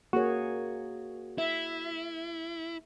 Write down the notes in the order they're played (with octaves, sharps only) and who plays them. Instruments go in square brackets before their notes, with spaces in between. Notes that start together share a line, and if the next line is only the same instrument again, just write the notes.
[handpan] A#3 G#4 C#5 [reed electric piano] F#4
[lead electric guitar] E4 [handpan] E5